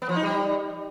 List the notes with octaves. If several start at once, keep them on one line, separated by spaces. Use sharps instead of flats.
B3
F3
D#4
G3